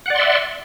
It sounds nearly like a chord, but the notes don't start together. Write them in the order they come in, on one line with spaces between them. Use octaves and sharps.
F#5 D5 C6 E5